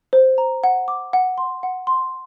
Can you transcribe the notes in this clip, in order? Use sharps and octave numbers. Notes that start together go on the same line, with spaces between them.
C5
A#5
F#5
D6
F#5
C6
F#5
C6